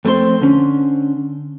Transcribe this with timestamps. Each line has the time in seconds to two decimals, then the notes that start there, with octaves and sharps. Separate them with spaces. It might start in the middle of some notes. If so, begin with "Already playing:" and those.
0.05 F2 A3 C4 A4 C6
0.41 D3 C#4